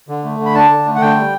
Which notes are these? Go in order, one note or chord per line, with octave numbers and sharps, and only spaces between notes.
D3
A3
D3
B5
D4 A5
D3
A3
F#5
D3 G5
G3